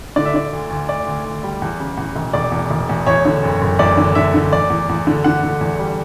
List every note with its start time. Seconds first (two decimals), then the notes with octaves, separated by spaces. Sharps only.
0.16 D3 D5
0.25 E5
0.34 D3 D5
0.53 D2
0.70 D2
0.89 D2 D5
1.06 D2
1.25 D2
1.43 G3
1.62 E2
1.80 C#3
1.97 E2
2.15 E1
2.33 E1 D5
2.52 E2
2.70 E1
2.89 E2
3.07 E2 C#5
3.25 D3
3.43 F#1
3.62 F#1
3.79 E2 D5
3.97 D3
4.15 D3 E5
4.34 D3
4.52 E2 D5
4.70 E2
4.89 E2
5.07 D3
5.24 D3 F#5
5.43 D3
5.61 E2
5.79 G3